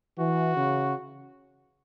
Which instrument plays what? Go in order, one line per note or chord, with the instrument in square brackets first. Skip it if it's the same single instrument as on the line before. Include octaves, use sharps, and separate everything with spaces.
[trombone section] E3 [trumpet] F#4
[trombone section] C#3